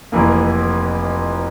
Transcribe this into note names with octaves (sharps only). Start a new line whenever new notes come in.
F1 F2 E3 A#3